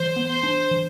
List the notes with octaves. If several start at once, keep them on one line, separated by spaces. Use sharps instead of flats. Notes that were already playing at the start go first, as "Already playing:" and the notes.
Already playing: E3 C5
B3
C5
D4
E3